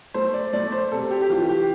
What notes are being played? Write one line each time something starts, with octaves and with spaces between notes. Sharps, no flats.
A3 C5
D5
A3 D5
C5
C3 A4
G4
G4
E3 F4
G4